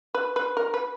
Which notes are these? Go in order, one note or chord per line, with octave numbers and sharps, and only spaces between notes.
B4
B4
A#4
B4